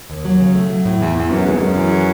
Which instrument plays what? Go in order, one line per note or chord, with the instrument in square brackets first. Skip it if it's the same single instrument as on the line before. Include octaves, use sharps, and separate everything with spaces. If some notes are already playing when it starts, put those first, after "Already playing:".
[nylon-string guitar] D#2
F#3
C#3
A3
F#3
A2
[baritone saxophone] E2 [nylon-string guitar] E3
[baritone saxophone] E2 [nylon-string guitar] E3
[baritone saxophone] F#2 [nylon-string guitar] B3
[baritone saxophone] F#2 [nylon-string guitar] G#3
[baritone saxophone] E2
[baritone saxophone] F#2 [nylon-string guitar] G#3
[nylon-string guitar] E3
G#4